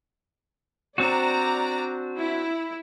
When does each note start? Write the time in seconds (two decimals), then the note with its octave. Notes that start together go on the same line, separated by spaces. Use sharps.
0.98 C4 D4 F#4 D5 A#5
2.17 E4